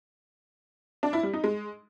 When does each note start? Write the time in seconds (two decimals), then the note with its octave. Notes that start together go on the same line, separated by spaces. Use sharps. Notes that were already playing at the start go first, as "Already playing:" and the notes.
1.03 D4
1.13 E4
1.23 G3
1.33 D#4
1.44 G#3